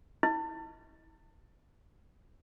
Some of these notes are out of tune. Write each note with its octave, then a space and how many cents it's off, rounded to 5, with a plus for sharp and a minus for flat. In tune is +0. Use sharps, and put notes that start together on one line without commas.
E4 -30